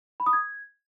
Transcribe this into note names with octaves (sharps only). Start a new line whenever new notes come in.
B5
D#6
G#6